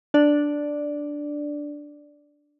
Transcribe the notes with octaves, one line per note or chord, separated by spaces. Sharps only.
D4 D5